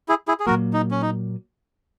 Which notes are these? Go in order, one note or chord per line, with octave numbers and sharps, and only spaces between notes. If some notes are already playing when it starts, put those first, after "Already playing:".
E4 G#4
E4 G#4
G#4
A#2 F#3 A#3 F#4 A#4
D#4
C#4
D#4